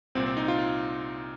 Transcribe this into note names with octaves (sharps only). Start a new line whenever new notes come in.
C2 A#2 C4
C4
D#4
F4
F4